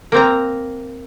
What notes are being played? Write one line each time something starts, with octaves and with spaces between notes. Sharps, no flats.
A#3 C4 A#5